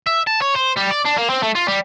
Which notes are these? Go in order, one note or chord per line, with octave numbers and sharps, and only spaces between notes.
E5
A5
C#5
C5
G3
D5
D4
A#3
C4
A3
F4
G3